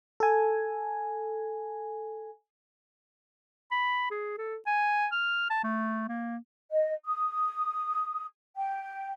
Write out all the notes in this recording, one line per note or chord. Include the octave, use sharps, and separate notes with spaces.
A4 G#5
B5
G#4
A4
G#5
F6
A5
A3
A#3
D#5
D#6
G5